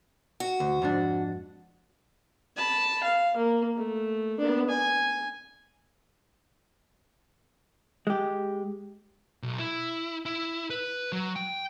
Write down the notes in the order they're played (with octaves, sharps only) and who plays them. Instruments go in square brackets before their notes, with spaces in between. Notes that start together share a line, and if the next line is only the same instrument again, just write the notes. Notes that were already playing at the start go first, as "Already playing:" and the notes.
[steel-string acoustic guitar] F#4
[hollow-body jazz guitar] D2
F2 G#2 D4
[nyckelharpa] A5 B5
F5
A#3
A3
B3 D4
G#5
[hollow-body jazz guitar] G#3 G4
[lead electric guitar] B1
E4
E4
B4
F#3
G5